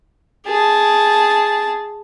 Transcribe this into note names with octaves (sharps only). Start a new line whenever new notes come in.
G#4 A5